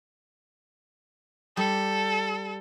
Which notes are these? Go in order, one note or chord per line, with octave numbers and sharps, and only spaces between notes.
G3 A4